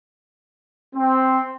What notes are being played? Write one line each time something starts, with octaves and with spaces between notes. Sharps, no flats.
C4